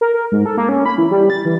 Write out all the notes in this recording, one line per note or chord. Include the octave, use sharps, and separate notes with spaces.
A#4
A#4
G#2
A4
A#3
C#4
B5
E3
G3
A6
E3